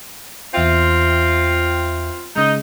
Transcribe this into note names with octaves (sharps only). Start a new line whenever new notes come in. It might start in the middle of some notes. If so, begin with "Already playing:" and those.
E2 C4 F4 E5 G5
C#3 G#3 D#4